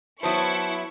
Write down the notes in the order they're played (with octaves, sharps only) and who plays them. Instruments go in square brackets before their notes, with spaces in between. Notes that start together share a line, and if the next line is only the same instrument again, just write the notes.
[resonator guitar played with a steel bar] F#3 B3 C5 [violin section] E4 C#6 [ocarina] A5